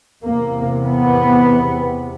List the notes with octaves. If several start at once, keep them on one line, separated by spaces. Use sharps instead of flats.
E2 C3 A#3
B3